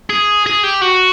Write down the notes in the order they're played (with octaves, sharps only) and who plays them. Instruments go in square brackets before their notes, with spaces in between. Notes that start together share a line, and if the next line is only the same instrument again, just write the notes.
[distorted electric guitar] G#4
G#4
G4
F#4